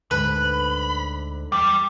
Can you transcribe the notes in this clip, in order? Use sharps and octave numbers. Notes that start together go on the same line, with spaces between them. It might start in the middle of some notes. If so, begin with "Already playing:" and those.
D2 G#2 D3 B4 B5
E2 G3 D6